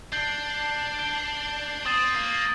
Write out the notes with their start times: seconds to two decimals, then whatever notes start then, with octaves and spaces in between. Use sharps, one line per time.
0.12 D4 G6 C7 G7
0.99 G6 D7 G7
1.85 C4 D#6 A6 D#7 F#7
2.14 A#3